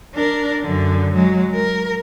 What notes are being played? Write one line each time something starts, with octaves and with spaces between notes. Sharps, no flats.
D4 A#4
F#2 D3
F#3 G#3
A#4